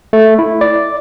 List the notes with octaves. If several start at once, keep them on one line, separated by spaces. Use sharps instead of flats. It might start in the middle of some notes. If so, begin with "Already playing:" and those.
A3
E4
D5